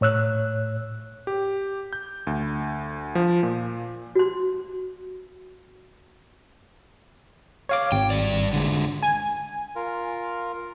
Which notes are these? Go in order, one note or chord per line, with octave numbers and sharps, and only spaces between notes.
A2 C#5 E6 F#6
G4
G6
D2
F3
A#2
F#4 C6
C#5 F5 D6
G#1 G5
G2 D5
D3 G#3
G#5
F4 A#4